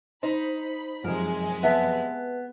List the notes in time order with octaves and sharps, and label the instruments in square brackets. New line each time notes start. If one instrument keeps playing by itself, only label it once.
[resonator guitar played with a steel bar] D#4 [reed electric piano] C5 [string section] B5
[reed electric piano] F#2 F3 F#3 [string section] C3 G#3 [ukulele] A#4
[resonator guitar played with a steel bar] B3 [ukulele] B4 E5 A5